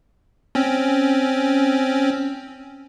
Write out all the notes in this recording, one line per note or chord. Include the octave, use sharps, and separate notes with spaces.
C4 C#4